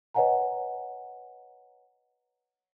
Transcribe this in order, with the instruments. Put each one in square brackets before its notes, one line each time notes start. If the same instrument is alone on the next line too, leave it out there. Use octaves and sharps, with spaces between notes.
[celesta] B4 C#5 D#5 F#5 G#5 A#5